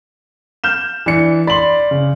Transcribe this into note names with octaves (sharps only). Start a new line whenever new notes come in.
F6 G6 E7
E3 D4 C#7
D5 B5 C6 F#7
C#3